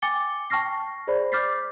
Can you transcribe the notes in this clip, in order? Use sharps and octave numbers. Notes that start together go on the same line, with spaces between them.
G5 G#5 D6 A6 C#7 G7
G5 A5 C#6 F6 A#6 C7
G#4 C5 D5 B5
D6 F6 G6 A6 B6 C7